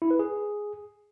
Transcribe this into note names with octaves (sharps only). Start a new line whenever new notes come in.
E4
B4
G#4